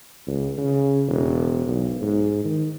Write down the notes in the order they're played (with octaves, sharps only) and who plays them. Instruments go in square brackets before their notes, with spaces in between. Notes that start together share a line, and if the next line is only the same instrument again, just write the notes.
[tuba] C#2
C#3
E1
B1
G#2
D#3